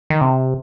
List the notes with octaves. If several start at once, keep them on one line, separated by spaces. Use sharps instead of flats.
D#3
C3